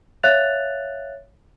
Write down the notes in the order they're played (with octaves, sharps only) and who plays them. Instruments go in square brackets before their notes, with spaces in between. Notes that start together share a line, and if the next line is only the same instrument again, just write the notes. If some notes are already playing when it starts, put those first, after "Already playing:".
[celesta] C#5 E5 F5 F#6 A6 F7